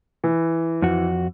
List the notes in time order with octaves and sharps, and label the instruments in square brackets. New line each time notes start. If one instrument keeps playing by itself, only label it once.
[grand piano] E3
[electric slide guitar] F2 F#4